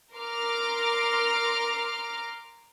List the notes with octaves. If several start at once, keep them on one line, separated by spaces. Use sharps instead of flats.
A#4 C6 D6 F6